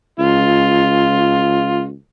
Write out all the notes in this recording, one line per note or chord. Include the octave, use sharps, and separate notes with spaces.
C#2 F4